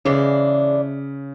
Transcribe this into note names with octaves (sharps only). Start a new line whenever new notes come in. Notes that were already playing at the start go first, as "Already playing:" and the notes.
C#3 E3 G#3 D4